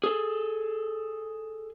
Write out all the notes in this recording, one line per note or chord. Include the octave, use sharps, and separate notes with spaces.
G#4 A4